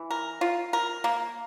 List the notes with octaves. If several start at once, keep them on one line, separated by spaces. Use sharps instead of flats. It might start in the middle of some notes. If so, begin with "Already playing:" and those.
Already playing: E3
A#4
F4
A#4
A#3